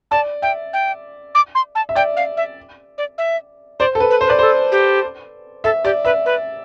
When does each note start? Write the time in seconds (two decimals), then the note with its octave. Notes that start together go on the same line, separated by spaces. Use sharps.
0.11 D5 A5
0.42 E5 G5
0.73 G5
1.35 D6
1.55 C6
1.75 A5
1.89 E5
1.95 D5 G5
2.17 F5
2.37 E5
2.98 D5
3.18 E5
3.80 C5 D5
3.95 A4
4.00 B4
4.10 B4
4.21 C5
4.27 B4
4.30 D5
4.39 A4 C5
4.72 G4
5.64 A4 E5
5.84 G4 D5
6.05 B4 E5
6.26 B4